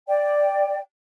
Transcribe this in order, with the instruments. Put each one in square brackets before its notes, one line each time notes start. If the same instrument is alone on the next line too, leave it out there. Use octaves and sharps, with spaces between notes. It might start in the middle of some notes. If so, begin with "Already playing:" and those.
[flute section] D5 G5